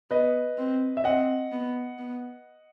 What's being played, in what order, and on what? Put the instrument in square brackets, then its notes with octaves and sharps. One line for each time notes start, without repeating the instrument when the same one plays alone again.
[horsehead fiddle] B3 [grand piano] B4 D#5
[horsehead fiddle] C4
[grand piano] E5
[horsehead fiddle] C4 [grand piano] D#5 F#5
[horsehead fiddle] B3
B3